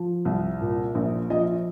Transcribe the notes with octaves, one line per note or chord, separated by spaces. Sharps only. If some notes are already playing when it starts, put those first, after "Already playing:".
Already playing: F3
C2
A#2
A#1
F3 D#5